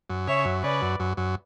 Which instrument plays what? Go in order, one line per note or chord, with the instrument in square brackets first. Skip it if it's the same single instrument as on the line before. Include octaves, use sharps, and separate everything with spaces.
[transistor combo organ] F#2
[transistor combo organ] C#3 [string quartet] C#5 E5
[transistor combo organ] F#2
[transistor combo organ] C#3 [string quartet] B4 D5
[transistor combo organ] F#2
F#2
F#2